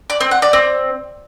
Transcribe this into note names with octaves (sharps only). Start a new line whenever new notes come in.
D5
C4
F#5
D5
C4